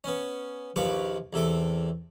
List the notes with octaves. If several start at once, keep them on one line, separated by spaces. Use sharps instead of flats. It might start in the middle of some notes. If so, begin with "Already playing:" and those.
B3 C#4
A#1 D#2 F3 B4 C#6 D6
E2 C3 A4 D6